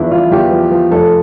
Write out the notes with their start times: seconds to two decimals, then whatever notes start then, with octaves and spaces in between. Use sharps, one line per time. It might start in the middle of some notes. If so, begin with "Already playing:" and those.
Already playing: E2 F3 D4 E4
0.11 E2 F4
0.31 E2 G4
0.51 F3
0.71 F3
0.91 F1 A4